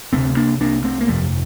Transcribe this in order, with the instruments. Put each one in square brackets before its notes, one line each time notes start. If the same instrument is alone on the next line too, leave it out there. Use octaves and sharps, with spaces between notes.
[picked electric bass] D2 C3 A3 C4
A#3 D4
C2 C3 A#3 D4
A3 C4
A#3
G1 F2 C3 F3 A3